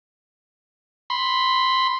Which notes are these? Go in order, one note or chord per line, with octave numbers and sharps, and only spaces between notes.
B5 C6